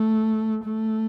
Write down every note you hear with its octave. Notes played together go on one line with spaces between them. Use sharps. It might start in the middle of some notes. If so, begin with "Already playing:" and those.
Already playing: A3
A3